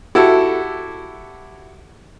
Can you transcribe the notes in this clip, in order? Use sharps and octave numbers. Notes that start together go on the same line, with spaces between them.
E4 F#4 G4 A4